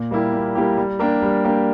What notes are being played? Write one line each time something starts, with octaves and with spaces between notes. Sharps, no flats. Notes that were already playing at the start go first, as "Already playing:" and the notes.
Already playing: A#2
G3 A#3 E4 G4
A#2
G3 A#3 E4 G4
G3
A#3 D4 G4 A#4
G3
A#3 D4 G4 A#4